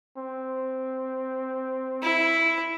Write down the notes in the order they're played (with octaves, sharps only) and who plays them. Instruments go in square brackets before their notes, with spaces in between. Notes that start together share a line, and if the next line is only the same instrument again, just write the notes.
[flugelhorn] C4
[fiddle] E4